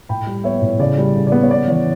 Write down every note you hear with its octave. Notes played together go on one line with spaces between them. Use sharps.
A2 G5 B5
G3
B3 C#5 E5
A2
C#3 D5
G3
C#3
D5
B3
C#5
B3 D5
E3 C#5